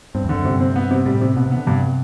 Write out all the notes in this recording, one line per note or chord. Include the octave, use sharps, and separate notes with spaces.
G2 C4
E2 D3
F#2
G2 C3
C4
B3
C3
A2 G3
C3
B2 B3
C3
D3 B3
G2 C3